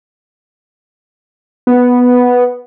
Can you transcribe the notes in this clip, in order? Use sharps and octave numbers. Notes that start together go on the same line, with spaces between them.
B3